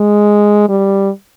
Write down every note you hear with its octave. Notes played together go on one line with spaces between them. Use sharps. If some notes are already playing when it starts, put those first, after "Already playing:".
Already playing: G#3
G3